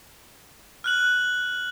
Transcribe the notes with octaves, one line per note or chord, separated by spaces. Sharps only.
F6 F#6 F#7